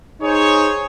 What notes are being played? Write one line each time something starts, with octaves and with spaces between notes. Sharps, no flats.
D#4 G#4 C5 C#5